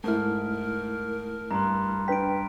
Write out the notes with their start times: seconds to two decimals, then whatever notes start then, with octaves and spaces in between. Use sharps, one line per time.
0.04 G#2 A3 E4 A#4 A5 F6
1.51 G2 A#5 C6
2.08 D4 B4 G5 B6 D7